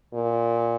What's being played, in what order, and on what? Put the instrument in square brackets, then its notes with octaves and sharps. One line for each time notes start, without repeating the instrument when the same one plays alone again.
[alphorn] A#2